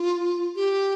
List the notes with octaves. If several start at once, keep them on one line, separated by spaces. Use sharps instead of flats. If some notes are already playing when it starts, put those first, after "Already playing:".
Already playing: F4
G4